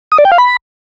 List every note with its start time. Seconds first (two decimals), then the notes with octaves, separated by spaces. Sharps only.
0.12 D#6
0.18 D5
0.25 G5
0.32 F5
0.38 B5